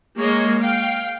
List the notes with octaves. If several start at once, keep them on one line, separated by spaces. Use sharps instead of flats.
G#3 A#3 C#5 D#5
F5 G5